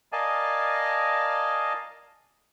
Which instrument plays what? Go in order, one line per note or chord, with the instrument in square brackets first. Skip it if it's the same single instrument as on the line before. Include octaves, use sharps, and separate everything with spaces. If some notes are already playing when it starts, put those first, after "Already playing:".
[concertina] A#4 D5 D#5 F5 G#5 A5